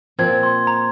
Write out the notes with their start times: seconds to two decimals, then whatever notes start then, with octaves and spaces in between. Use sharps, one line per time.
0.19 A#2 F3 C4 G#6
0.43 C6
0.67 A#5